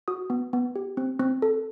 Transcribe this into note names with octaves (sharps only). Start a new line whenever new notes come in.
F#4 D#6
B3
B3
G4
C4
C4
A4